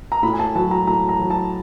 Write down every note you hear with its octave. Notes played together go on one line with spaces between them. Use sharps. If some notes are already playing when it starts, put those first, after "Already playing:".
A#5
A2 B5
G#5
A5
F#3 A5
A#5
A2 A#5
A#5
F#3
A5